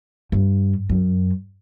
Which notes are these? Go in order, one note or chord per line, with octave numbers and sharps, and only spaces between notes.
G2
F#2